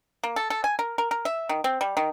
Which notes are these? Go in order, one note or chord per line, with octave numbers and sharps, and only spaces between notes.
A#3
A4
A4
G#5
A#4
A#4
A#4
E5
D#3
C4
G3
D#3